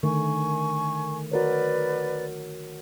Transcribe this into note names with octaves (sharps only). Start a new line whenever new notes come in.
D3 D#3 A3 G#5 C#6
F#4 A#4 B4 C#5 D5